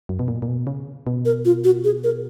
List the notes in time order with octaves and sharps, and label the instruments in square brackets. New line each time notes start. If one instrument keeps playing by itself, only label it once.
[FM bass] F#2
B2
A#2
A#2
B2
C#3
B2
[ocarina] A#4
F4
F#4
G#4
A#4